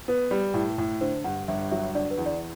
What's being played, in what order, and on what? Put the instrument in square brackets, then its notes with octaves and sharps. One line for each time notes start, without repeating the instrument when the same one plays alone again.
[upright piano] B3 [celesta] B4
[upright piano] G3
A2
A2
[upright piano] D3 [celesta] C5
[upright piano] G2 [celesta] F#5
[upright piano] G1 [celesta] E5
[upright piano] F#3 [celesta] E5
[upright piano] D3 [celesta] D5
[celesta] B4
[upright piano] E2
[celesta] D5